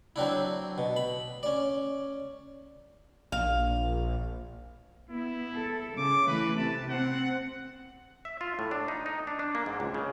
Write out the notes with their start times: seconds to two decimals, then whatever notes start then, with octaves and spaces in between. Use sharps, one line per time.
0.16 F#3 C4 D4 E4
0.78 B2
0.96 B5
1.43 C#4 D5
3.32 A#1 F5
5.10 B3 E4
5.56 A4
5.98 C#3 D6
6.27 E3 A3 B4
6.57 C3 A5
6.89 C4 F#5
8.25 E5
8.41 F4
8.59 A2
8.71 D4
8.88 D#4
9.06 D#4
9.27 D4
9.39 D4
9.55 A#3
9.66 G#2
9.80 C#2
9.94 C#3